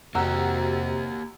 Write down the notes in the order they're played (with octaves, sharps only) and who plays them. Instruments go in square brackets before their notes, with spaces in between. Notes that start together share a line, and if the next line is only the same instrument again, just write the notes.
[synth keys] F2 F#4 [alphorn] C3 [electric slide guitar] A#3 G4 [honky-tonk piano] F#5 A#5 E6